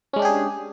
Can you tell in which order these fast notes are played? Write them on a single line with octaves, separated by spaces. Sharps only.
C#4 G#3 D4 G4 G#4